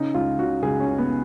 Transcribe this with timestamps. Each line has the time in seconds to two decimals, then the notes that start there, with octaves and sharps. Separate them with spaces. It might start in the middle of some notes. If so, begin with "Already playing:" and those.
Already playing: C#3 D#4
0.14 C#2 F4
0.39 C#3 F#4
0.63 C#2 G#4
0.80 C#4
0.87 C#3
0.98 B3